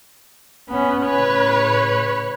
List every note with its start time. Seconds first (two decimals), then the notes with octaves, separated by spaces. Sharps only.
0.69 B3 C#4
1.06 A2 C#3 B4 C#5